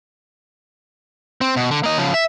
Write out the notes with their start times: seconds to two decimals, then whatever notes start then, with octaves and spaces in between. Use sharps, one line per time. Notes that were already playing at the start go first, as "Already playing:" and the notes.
1.41 C4
1.56 B2
1.71 D3
1.84 A#3 D#5
1.98 C#3 F3
2.14 E5